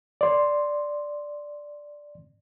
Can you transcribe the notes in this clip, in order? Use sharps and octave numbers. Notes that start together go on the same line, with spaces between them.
D5 C6